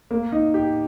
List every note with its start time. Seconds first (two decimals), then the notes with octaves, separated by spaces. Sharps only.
0.11 A#3
0.32 D#4
0.54 G4